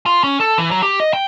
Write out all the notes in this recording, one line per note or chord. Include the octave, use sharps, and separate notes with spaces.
F4
C#4
A4
E3
F#3
G4
D#5
G5